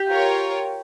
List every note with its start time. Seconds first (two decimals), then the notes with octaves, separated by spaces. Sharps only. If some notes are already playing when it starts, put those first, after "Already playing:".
Already playing: G4
0.09 F4 A#4 C#5